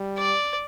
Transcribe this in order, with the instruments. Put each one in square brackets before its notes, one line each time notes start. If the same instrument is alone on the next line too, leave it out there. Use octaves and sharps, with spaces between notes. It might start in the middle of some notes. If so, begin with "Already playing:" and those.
Already playing: [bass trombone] G3
[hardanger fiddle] D5